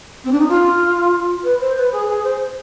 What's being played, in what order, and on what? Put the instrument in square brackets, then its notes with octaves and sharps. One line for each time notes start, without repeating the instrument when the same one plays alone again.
[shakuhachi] C4
D4
D#4
F4
B4
C5
B4
G#4
G#4
C5